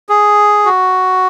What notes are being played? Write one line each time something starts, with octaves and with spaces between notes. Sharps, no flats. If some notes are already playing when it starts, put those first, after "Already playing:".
G#4
F#4